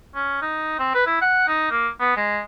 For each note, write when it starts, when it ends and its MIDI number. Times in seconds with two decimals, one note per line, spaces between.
0.15 0.41 61
0.42 0.74 63
0.79 0.91 60
0.95 1.02 71
1.06 1.21 64
1.21 1.45 78
1.48 1.68 63
1.70 1.88 58
2.00 2.16 59
2.17 2.40 56